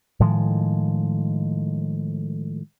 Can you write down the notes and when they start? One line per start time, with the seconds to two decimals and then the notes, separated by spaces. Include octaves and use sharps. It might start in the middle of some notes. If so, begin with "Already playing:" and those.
0.20 A2 D#3 F3 G#3